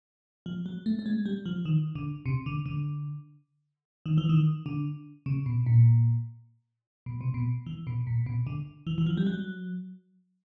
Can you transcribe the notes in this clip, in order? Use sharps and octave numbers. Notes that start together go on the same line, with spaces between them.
F3
F#3
A3
A3
G#3
G3
F3
D#3
D3
C3
D3
D3
D#3
E3
D#3
D3
C#3
B2
A#2
B2
C3
B2
E3
B2
A#2
B2
D3
E3
E3
F3
G3
F#3